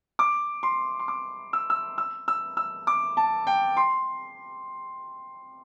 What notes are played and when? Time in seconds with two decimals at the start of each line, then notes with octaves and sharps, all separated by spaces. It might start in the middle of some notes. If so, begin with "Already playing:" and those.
0.19 D6
0.63 C6
0.99 C6
1.08 D6
1.53 E6
1.70 E6
1.98 E6
2.28 E6
2.57 E6
2.87 D6
3.17 A5
3.47 G5
3.77 C6